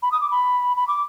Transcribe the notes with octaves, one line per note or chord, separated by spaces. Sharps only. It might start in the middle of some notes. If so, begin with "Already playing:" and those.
B5
D#6
D6
B5
B5
D6